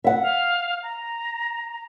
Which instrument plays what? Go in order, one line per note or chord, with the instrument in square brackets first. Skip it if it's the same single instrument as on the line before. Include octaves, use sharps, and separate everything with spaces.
[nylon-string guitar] E5 F#5
[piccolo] F5
A#5